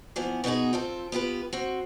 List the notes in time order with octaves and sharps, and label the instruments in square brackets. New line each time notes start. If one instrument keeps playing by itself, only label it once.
[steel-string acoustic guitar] E3 F3 B3
B2 B3 D#4 F#4 G#4
C4 F4 A4
B3 F4 G4 B4
C4 F#4